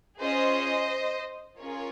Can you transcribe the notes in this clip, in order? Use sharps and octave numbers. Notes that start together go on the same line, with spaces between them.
C#4 F4 G#4 C5 D#5
C#4 F4 G#4 A#4 C#5